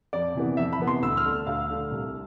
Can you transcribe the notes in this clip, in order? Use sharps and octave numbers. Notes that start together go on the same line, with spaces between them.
F2 D5
C3 E3 B3
F2 E5
B5
C3 E3 B3
C6
D2 E6
F6
D3 A3 D4
D2 F5
D3 A3 D4
C2